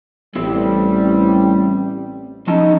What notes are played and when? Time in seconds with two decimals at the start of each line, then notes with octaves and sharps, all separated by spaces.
0.36 A1 G3 C4 E4 G4
2.47 F3 C#4 D#4 A5